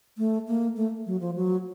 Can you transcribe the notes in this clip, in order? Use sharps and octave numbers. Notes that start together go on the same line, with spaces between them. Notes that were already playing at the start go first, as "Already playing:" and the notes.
A3
A#3
A3
F#3
F3
F#3